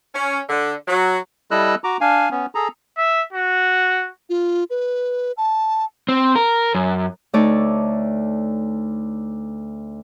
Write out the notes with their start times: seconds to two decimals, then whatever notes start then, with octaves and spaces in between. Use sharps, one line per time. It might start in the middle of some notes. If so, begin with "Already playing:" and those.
0.15 C#4
0.50 D3
0.88 F#3
1.51 G3 E4 A4 D#5 E6 F#6
1.84 F#4 A#5 D6
2.01 D4 F5 G#5
2.31 B3 C#4
2.55 G#4 A4 A#5
2.97 E5
3.33 F#4
4.29 F4
4.70 B4
5.37 A5
6.09 C4
6.35 A#4
6.75 F#2
7.33 D2 A3 D#4 C#5 D5 A5